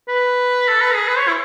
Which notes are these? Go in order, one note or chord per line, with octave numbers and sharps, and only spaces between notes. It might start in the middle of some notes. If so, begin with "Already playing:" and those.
B4
A4
B4
G#4
B4
C#5
E4